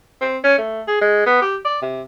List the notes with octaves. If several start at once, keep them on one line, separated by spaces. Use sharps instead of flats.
C4
C#4
A3
G#4
G#3
B3
G4
D5
C3